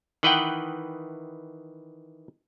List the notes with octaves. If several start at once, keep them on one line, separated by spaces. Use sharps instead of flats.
D#3 E3 B4 D#5 F#5 G5